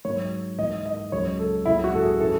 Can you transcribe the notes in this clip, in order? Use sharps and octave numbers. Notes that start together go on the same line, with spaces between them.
G#2 F#3 C#5
G#2 E3 D#5
D#5
C#2 C#3 F#3 C#5
A4
C#2 C#3 F#3 E4
F#4
A4
G#4
C#3 E3 A4